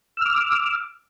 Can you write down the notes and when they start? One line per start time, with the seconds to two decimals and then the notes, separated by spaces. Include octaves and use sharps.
0.17 E6
0.21 F6
0.26 D6